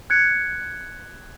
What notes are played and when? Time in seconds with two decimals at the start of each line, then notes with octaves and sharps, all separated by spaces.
0.10 F#6 G#6 C#7